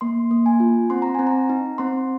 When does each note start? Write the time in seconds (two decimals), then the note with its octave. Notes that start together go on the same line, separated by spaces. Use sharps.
0.01 A#3 C6
0.31 A#3
0.46 G#5
0.60 F4
0.90 C4 C6
1.02 A#5
1.15 C4 G#5
1.27 A#5
1.49 D#4
1.78 C4 C6